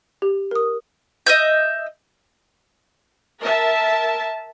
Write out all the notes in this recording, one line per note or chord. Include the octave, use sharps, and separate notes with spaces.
G4
A#4 D#6
D#5 E5 G6
A#4 E5 A5